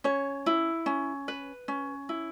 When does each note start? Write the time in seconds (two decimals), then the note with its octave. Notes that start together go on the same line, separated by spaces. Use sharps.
0.04 C#4 C#5
0.46 E4
0.86 C#4
1.28 B4
1.68 C#4
2.09 E4